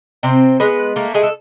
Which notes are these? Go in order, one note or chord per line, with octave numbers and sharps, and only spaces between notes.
C3 C4 C5
G#3 B3 B4
A3 A#3 A#4
G#3 G#4
A4